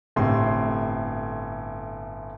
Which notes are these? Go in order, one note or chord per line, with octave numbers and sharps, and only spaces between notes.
G1 A2 C3 C6